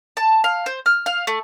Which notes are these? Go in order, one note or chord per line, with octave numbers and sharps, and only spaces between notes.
A5
F5
C5
F6
F5
A3